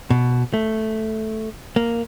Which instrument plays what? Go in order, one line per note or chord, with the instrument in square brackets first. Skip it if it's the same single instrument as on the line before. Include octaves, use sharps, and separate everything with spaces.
[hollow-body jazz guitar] B2
A3
A#3